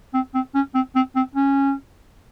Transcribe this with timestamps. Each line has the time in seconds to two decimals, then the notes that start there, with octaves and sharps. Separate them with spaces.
0.14 C4
0.34 C4
0.55 C#4
0.75 C4
0.95 C4
1.16 C4
1.35 C#4